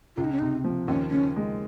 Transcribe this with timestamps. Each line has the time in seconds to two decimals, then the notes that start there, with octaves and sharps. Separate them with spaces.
0.16 C#2 F4
0.24 D#4
0.32 C#4
0.39 C3 D#4
0.64 F3
0.88 D#2 C#4
1.10 C#3 C#4
1.36 G#3